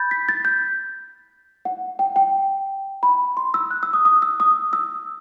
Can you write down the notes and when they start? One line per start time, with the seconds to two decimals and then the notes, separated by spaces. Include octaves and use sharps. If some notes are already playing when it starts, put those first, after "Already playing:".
Already playing: B5 G6 A6
0.11 B6
0.29 A6
0.45 G6
1.65 F#5
1.99 G5
2.16 G5
3.03 B5
3.37 C6
3.54 E6
3.71 F#6
3.83 E6
3.93 D#6
4.05 D#6
4.22 E6
4.40 D#6
4.73 E6